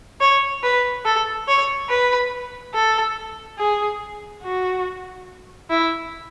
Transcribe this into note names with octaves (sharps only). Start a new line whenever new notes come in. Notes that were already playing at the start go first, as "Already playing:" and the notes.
C#5
B4
A4
C#5
B4
A4
G#4
F#4
E4